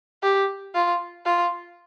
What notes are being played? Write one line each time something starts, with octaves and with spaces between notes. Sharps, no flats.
G4
F4
F4